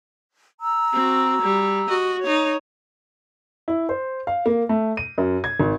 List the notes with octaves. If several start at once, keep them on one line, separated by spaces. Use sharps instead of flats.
A#5 E6
C4 F#4
G3
F#4 D#5
D#4 C#5
E4
C5
F5
A#3
A3
D#7
F#2
G#6
G#1